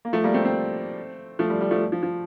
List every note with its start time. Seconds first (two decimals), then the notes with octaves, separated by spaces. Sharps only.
0.05 A#3
0.13 F3 A3
0.24 G3 A#3
0.34 A3 C4
0.45 A3 C4
1.39 F3 A3
1.50 G3
1.61 G3
1.71 F3 A3
1.92 F3
2.03 F3